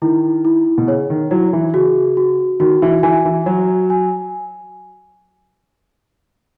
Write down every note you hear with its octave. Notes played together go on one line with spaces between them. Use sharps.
D#3 E4
E4
B2
C#3 C#5
D#3
F#3 E4
E3
C#3 F#4
F#4
D#3 F#4
E3
E3 G#5
E3
F#3 F#4
G#5